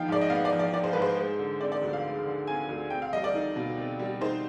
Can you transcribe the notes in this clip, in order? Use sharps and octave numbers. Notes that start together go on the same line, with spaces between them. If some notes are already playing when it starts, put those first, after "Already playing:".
Already playing: F3 B3 D#4 F5 G5
G#2 D5
D#5
B3 F5
D5
F3
D5
D#4 D5
C5
G#2 B4
C5
G#3 C5
D3
C4 D5
D5
D2
F5
G#3
D3
C4 G#5
D2
C4 G5
F5
G3 D#5
D5
D#4
B2
C4
G3
D#4 C5